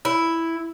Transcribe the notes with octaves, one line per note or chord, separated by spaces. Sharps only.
E4